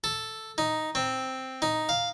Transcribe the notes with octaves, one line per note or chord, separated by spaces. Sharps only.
A4
D#4
C4
D#4
F5